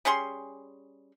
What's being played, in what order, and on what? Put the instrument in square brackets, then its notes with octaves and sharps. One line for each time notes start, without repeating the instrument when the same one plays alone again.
[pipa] G3 C#4 G#4 C6